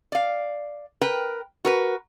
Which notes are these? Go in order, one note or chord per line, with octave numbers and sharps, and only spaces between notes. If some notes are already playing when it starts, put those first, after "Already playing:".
D5 F5
A#4 B4 G5
F#4 A#4 B4